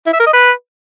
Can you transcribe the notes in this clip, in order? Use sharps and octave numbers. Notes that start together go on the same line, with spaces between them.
E4
E5
A#4
D#5
B4